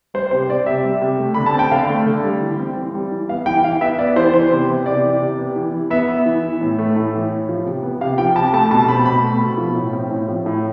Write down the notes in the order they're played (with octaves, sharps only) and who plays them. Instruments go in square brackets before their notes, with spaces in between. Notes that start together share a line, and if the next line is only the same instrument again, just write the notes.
[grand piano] G3 C5
C3 C5
C4 D5
C3 E5
G3
C3
A3
D3 B5
A5
C4 G5
D3 F5
A3
D3
G3
E3
C4
E3
G3
E3
B3 F5
E3 G5
E3 F5
B3 E5
B3 D5
E3 C5
E3 C5
C3
B3
C3 D5
E3
C3
B3
E3
E3
B3 E5
B3
E3
E3
A2
A3
A2
E3
A2
F3
C3
B3
C3 F5
F3 G5
C3 A5
A3 A5
B2 A5
C4 B5
B2 B5
A3
B2
F3
A2
C4
A2
F3
A2